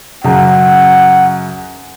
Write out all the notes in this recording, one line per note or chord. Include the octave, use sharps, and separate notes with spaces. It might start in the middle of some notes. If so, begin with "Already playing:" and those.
F#2 C#3 F#5